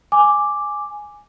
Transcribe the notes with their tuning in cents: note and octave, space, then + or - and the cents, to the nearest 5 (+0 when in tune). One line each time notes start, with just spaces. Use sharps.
G#5 +0 D6 +0